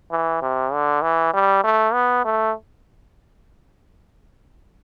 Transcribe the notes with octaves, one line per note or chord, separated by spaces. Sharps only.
E3
C3
D3
E3
G3
A3
B3
A3